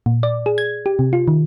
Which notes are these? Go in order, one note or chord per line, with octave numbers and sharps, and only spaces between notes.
A#2
D5
G#4
G#6
G4
C3
F4
D#3